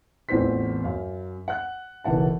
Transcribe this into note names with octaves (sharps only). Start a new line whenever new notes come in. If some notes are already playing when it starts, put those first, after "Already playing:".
A1 E2 C4 F4 C5 B6
F#2 F5
F#5 F#6
F#1 B1 E3 F#5 A5